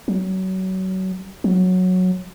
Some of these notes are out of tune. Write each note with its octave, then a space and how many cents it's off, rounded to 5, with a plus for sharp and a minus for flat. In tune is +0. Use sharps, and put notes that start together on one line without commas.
F#3 +25
F#3 -10